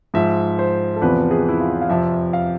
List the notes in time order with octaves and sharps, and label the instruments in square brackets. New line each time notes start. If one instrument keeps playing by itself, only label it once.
[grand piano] G#2 F3 E5
C5
A4
E2 C3 F3 B4
G#4
E4
F4
F5
F2 C3 F3 E5
F5